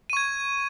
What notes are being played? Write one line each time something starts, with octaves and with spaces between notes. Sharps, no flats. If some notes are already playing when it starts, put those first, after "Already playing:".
C#6 G#6 D#7